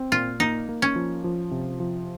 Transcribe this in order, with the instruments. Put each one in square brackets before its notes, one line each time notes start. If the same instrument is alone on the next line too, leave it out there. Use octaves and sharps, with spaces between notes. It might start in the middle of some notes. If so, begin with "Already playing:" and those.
Already playing: [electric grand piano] C4
[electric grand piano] A#2 [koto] F4
[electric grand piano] A#3 [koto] D#4
[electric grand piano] A#3
[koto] C#4
[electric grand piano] F3
F3
C3
F3